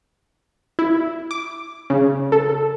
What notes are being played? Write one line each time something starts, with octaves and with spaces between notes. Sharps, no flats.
E4
D6
C#3
A4